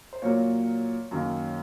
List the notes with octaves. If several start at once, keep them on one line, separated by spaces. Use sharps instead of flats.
C5
A#2 F#3 A#3 C#5
F#2 D#3 A#3